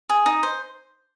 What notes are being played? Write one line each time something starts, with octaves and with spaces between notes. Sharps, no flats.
G#4
D#4
C5